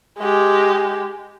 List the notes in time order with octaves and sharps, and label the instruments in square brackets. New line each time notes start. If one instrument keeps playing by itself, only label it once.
[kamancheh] G#3 G4